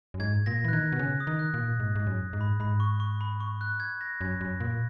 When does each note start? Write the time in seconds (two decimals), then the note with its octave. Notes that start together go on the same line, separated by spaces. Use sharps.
0.14 F#2
0.20 G#2 G#6
0.46 A#2 A#6
0.64 E3
0.68 F#6
0.73 D#3 G#6
0.92 B2
0.99 C#3 F#6
1.20 D#6
1.27 D#3
1.39 F#6
1.54 A#2
1.80 G#2
1.96 G#2
2.07 F#2
2.33 G#2
2.41 B5
2.60 G#2 B5
2.80 C#6
3.00 C#6
3.21 B5
3.40 C#6
3.61 F#6
3.80 G#6
4.01 A#6
4.21 F#2 G#6
4.41 F#2
4.60 A#2